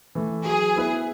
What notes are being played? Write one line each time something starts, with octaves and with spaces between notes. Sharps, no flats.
E3 A3
F#3 G#4
B3 E4 B4